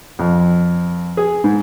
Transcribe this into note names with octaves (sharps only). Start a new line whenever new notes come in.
F2
G#4
G#2